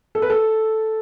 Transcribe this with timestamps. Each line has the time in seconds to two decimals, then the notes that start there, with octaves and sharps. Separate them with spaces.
0.15 A4
0.22 B4
0.30 A4